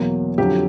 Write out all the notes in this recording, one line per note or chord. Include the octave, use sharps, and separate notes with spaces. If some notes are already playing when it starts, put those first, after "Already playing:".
Already playing: E2 B2 F#3 A#3
F2 D3 F#3 G4